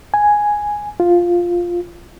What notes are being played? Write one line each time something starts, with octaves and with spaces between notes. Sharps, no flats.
G#5
F4